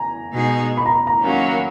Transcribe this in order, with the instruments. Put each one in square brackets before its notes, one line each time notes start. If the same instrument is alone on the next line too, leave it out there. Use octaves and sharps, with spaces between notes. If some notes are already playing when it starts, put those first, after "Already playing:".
Already playing: [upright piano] G#5 A#5
[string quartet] B2 G#3 D#4 G#4
[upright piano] B5
A#5
B5
A#5
[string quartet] D#3 F#3 A#3 C#4